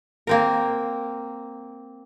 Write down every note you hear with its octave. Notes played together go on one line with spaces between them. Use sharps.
A#3 C4 A#4